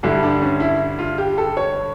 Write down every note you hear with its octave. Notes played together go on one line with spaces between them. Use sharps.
G2 D3 G3 E4
D4
C#4
E4
F4
G4
A4
C#5